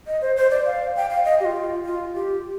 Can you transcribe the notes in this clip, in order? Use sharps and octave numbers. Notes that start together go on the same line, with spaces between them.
D#5
C5
C5
D5
F5
G5
F5
D#5
G4
F4
F4
G4